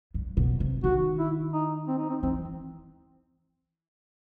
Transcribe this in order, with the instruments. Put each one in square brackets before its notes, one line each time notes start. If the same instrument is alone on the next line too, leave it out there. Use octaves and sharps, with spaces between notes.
[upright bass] G2
B2
C3
[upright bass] D#3 [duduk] F#4
[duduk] E4
D#4
C4
D#4
C4
[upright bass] E3 [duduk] C4